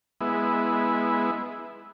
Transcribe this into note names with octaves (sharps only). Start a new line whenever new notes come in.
G#3 B3 E4